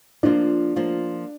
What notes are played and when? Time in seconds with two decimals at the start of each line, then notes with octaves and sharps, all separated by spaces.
0.23 F3 A#3 D4 F4
0.76 F3 A#3 F4